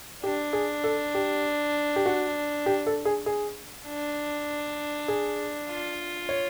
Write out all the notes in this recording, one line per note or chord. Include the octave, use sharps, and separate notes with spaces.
D4 G4
G#4
A4
G4
G4
F#4
G4
A4
G#4
G#4
D4
G#4
F4
C#5